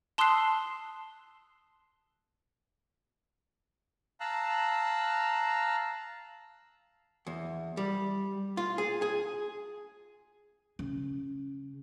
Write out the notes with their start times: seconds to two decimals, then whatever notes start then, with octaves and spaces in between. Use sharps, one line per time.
0.18 A5 C6 D#6 E6 F#6 C7
4.20 F5 A5 A#5 E6 F#6
7.26 E2
7.77 G3
8.57 F4
8.78 G#4
9.02 G#4
10.79 C#3